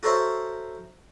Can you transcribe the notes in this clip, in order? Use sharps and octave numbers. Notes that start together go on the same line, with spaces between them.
F#4 A4 A#4 C5 C#5 E5